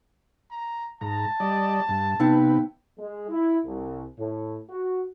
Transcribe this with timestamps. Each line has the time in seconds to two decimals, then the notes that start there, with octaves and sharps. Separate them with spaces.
0.51 A#5
1.01 G#2 A5 A#5
1.40 G3 D5 D#5
1.88 G2
2.20 C3 B3 D#4 B4 G5
2.97 G#3
3.29 E4
3.64 C2
4.17 A2
4.69 F#4